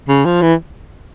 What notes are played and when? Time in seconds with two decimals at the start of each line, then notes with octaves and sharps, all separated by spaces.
0.08 C#3
0.25 F3
0.42 E3